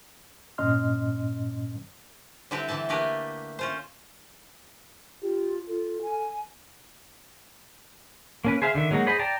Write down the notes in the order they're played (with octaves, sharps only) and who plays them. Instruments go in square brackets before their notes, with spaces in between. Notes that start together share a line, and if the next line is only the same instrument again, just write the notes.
[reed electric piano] G2 A#2 C#4 D#5 C6 F6
[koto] D3 G3 C4 E4 G4 B4
D3 E3 E5 A5
A3 A#3 D4 G4 B4 G#5
C#4 F4 C5
[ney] F4 [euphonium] G4
[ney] F4 [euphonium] A4
[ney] G#5
[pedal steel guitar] A#3 C#4 B4
G#4 C5 E5 F5
D3 D#3 E5
F#3 G#3 A#3 D#4 F#4
G#4 C5 D#5 B5
D5 G5 A5 A#5